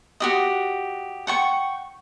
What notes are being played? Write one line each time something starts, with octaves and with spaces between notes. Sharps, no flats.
F#4 G4 D#5
F#5 G5 C#6